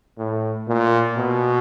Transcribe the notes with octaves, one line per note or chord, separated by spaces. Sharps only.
A2
A#2
B2